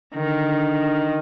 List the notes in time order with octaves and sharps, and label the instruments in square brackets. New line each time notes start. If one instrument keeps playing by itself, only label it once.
[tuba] D3 [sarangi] D#3